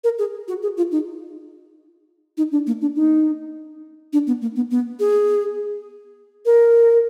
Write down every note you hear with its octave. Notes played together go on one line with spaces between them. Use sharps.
A#4
G#4
F#4
G#4
F4
D#4
D#4
D4
A#3
D4
D#4
D4
B3
A#3
B3
B3
G#4
A#4